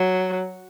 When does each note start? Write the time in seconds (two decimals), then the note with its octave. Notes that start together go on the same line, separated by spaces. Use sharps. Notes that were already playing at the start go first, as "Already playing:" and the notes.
Already playing: F#3